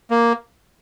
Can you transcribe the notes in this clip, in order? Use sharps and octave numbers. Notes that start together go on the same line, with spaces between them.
A#3